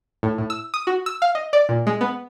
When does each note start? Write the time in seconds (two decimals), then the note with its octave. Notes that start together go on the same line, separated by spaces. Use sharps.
0.23 A2
0.38 A2
0.50 E6
0.74 D#6
0.87 F#4
1.06 E6
1.22 F5
1.35 D#5
1.53 D5
1.69 A#2
1.87 G#3
2.01 B3